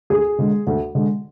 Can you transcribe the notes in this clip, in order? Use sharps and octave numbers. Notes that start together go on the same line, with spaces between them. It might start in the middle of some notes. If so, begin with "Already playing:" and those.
D2 G#4
D3 G#3
D2
D3 G#3